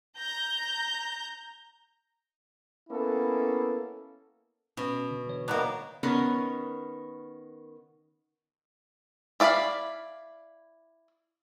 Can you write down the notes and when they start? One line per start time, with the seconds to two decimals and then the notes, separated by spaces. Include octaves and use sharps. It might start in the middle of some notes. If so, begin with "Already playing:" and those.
0.16 A#5 G6
2.89 A#3 B3 C#4 E4 A4
4.77 B2 C#4
5.11 D3
5.27 D3 E3 C#5
5.48 B2 G3 A#3 D4 D#4 C#5 F#5
6.03 D#3 B3 C#4 A#4 C#5
9.40 E4 D5 F5 G#5 B5